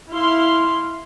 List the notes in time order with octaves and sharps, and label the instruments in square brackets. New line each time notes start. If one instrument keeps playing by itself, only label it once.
[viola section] E4 F5 C6